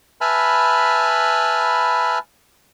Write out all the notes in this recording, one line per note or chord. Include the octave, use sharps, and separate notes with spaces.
B4 E5 G#5 A5 B5 F6